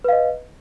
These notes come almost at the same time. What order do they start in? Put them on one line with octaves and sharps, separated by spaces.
B4 F5 D#5